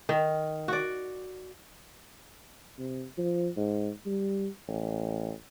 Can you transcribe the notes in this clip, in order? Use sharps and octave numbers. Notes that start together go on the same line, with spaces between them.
D#3
F#4 D5
C3
F3
G#2
G3
A1